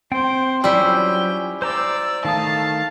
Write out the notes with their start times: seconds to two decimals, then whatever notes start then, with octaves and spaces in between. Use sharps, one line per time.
0.12 C4 C5 G5
0.64 F#3 G3 C#4 E4 F4 C5 G5
1.62 C5 D5 A#5 D6 E6
2.25 D#3 A3 F5 A5 D#6